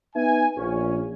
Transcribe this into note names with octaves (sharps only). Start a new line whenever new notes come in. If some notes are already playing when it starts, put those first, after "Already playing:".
B3 D#4 B4 E5 G#5
A#1 C#4